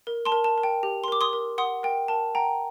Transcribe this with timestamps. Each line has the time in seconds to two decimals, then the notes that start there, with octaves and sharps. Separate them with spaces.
0.07 A#4
0.25 A5 C6
0.32 A#4
0.44 A5
0.58 A#4
0.63 G5
0.83 G4
1.04 C6
1.08 A#4 D6
1.21 C6 D#6
1.33 A#4
1.58 F#5 C6 D#6
1.83 A#4 G5
2.08 A#4 A5
2.35 F#5 G5 A#5